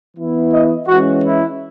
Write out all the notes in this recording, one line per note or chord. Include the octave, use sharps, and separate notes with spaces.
E3 B3 E4
D#5
E3 G#3 C#4 F#4
E4